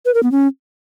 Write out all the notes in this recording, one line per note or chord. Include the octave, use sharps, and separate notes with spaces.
B4
A#4
B3
C#4